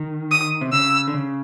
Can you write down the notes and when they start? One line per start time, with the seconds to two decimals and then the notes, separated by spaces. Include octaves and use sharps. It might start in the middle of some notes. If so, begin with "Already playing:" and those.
Already playing: D#3
0.31 D#6
0.61 C3
0.72 C#3 E6
1.07 D3
1.14 C#3